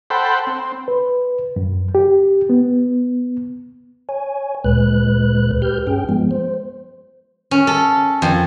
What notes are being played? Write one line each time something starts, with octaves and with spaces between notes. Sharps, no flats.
A4 C5 F#5 G5 B5
C4
B4
F#2
G4
B3
C#5 G#5
D2 A#2 G#3 B4 F#6
G4 B4 F6 G6
G2 C#4 G#4 G5
F3 G#3 B3
C5
C#4
A4
F2